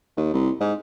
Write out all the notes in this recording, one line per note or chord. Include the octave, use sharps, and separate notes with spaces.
D#2
C2
G#2